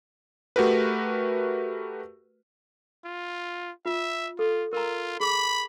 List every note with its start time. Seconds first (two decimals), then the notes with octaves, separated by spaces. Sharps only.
0.56 A3 F#4 G4 A#4 B4
3.05 F4
3.86 F4 E5
4.39 F4 A4
4.73 F4 A#4 A#5
5.20 G#4 B5 D6